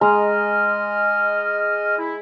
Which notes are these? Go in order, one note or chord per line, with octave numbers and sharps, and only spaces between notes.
G#3 D#5 A#5 F6
E4